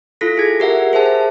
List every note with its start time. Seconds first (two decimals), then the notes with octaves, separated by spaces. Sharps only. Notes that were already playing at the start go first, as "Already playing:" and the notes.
0.21 E4 F4 A4 A#6 B6
0.37 G#4 G#6
0.60 G4 A#4 E5 F#5
0.93 G#4 C5 E5 A5
1.06 A5